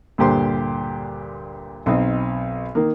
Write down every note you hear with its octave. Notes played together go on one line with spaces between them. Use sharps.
D2 G2 A#2 G4 C5 C6
B1 B2 C4 D#4
D#3 A#3